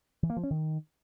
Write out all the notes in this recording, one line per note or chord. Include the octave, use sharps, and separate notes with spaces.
E3
A#3
F3
C#4
D#3